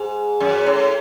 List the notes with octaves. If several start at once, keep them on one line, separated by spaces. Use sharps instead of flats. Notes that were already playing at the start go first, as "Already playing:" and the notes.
Already playing: G#2
F#2
A2